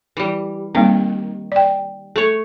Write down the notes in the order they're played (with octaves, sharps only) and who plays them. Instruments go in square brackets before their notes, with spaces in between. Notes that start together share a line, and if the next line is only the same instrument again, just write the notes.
[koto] E3 G3
[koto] D#3 [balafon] G3 A#3 C4
[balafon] D5 G5
[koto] A3 C#5